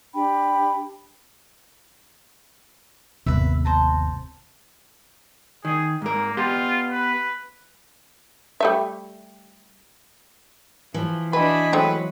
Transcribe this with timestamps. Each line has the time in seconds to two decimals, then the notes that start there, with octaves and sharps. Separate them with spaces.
0.14 D4 G4 G5 B5
3.26 G1 D#2 C3 B4 E5
3.65 C5 A5 A#5
5.65 D#3 G#4
6.02 G#2 A#3 A#4
6.37 B3 F4 G4 C6
6.90 B4
8.60 G3 A3 E5
10.94 E3 F3
11.33 D4 F#4 B4 D#5 E5 G#5 B5
11.73 F#3 G#3 A3 C4 F#4 B4